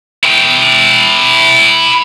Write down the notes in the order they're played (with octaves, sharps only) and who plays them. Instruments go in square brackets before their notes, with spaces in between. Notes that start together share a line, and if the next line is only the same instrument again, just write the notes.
[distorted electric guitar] E4 G5